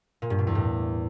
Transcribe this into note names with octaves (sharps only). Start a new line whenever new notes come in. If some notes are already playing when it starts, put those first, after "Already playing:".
A#2
G2
B2
E2
A2